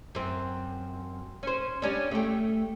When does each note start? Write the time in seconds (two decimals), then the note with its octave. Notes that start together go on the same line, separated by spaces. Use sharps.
0.15 F#2 C4
1.43 C#4 C5
1.82 G3 C#4 D4
2.11 A3 G4